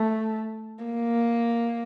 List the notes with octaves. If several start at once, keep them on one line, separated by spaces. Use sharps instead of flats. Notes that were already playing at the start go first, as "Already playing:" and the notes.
Already playing: A3
A#3